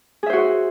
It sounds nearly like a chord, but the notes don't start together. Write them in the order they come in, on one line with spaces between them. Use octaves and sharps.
G#4 E5 C5 F#4